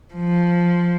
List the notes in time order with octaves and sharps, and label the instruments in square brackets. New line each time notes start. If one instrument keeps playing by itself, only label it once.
[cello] F3